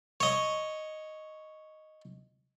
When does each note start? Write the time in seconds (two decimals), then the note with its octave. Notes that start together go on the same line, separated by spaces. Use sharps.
0.20 C#5 D#5